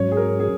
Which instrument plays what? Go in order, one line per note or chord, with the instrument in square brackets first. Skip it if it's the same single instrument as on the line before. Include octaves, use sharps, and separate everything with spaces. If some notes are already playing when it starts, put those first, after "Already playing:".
Already playing: [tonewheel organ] G#2 F#3 C#4 [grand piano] C#5
[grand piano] G#4
A#4
G#4